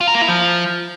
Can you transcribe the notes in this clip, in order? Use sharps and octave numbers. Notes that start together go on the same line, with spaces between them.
F4
A#4
A#3
E4
F3